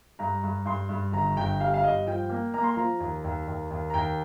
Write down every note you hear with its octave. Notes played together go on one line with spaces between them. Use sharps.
G2 A#5
G2
G2 C6
G2
G1 A#5
G1 G5
G3 F5
F5
G2 D#5
F3 G5
A#3
A#3 A#5
C6
F3 A#5
D#2
D#2
D#2
D#2
A#5
D#2 G5